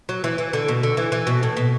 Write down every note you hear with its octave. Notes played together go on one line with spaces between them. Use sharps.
F#3
E3
E3
D3
B2
D3
E3
E3
B2
A2
B2